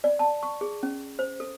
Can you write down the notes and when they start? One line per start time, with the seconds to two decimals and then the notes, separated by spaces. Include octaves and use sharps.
0.04 D5
0.19 A5
0.43 C#6
0.61 G#4
0.83 C#4
1.19 C5
1.40 A4